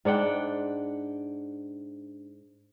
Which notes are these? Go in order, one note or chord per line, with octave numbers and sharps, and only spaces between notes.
G#2 D4 F#5 G5